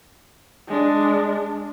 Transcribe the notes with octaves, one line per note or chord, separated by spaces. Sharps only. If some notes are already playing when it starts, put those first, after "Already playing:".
G#3 D4